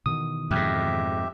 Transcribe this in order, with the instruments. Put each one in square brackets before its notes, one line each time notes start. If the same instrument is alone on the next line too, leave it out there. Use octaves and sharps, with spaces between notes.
[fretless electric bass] B2 D#3 E3 [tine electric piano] D#6
[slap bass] F2 G#2 [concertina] G4 E5